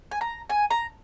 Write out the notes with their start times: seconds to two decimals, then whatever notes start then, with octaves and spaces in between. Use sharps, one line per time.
0.11 G#5
0.21 A#5
0.50 G#5
0.71 A#5